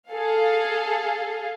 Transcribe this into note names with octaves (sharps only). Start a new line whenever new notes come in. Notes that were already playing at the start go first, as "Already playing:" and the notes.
G#4 A4 F5